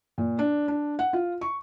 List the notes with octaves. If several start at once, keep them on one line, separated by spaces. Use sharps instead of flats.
A#2
D4
D4
F#5
F4
C#6